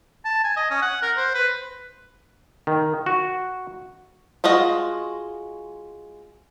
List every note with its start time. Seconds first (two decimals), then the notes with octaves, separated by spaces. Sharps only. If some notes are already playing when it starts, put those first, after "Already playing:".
0.25 A5
0.44 G#5
0.57 D#5
0.71 C#4
0.82 F#5
1.02 A#4
1.17 C5
1.34 B4
2.67 D#3
3.06 F#4
4.44 G#3 F4 F#4 D#5